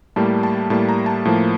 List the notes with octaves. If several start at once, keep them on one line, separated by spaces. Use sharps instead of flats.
A2 G3 A#3 A5
A5
A2 G3 A#3 A5
A#5
A5
A2 F3 A#3